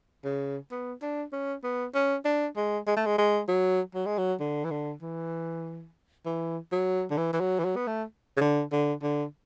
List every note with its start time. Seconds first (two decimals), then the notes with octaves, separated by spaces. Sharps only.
0.25 C#3
0.72 B3
1.02 D4
1.33 C#4
1.64 B3
1.95 C#4
2.25 D4
2.57 G#3
2.87 G#3
2.96 A3
3.06 G#3
3.18 G#3
3.48 F#3
3.95 F#3
4.06 G#3
4.18 F#3
4.40 D3
4.65 E3
4.71 D3
5.02 E3
6.26 E3
6.72 F#3
7.11 D3
7.17 E3
7.33 E3
7.40 F#3
7.59 E3
7.64 F#3
7.76 B3
7.87 A3
8.37 C#3
8.41 D3
8.72 D3
9.03 D3